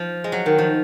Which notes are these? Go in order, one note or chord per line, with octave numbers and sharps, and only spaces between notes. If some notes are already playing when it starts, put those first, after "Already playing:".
Already playing: F3
G#3
F#3
D#3
F3